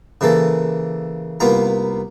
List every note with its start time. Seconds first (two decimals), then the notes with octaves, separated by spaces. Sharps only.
0.21 C#3 E3 A#3 A4
1.40 C2 A#3 B3 F4 A#5